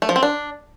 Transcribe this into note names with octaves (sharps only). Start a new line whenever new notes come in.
A3
F3
C4
D4